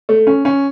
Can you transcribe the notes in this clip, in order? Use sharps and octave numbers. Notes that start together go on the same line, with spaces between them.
A3
C#4
C#4